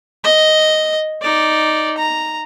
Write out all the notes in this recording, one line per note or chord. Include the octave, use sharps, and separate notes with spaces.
D#5
D#4 D5
A#5